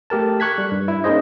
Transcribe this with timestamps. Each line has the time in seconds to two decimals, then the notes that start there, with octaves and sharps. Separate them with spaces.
0.10 A3 G4 A#4 A5
0.40 C#6 F#6 G#6 B6
0.58 G3
0.72 G2
0.88 E4
1.04 A#3 C#4 D#4 G#4 C5 D#5